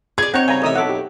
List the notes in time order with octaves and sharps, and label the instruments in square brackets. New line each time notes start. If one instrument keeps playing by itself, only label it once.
[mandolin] G#4 D5 [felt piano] G#6
[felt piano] C4 [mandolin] D#4 C#5 [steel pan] F#5 G5
[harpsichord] G2 C#3 [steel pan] G#5 A#5
[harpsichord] A1 C3 E5 [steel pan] A#4 D#5 D#6
[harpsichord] B1 D6 [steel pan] A4 E5 F#5
[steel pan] G4